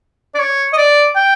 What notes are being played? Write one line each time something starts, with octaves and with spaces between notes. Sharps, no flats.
D5
C#5
D#5
D5
G5